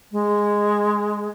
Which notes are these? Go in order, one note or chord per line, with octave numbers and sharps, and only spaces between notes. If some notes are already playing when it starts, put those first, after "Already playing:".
G#3